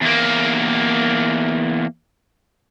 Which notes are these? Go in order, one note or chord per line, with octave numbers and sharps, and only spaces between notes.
E2 A#3